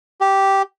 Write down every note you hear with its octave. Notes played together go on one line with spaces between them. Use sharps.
G4